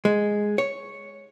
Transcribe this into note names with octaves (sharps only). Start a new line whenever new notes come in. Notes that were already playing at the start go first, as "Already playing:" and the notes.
G#3
C#5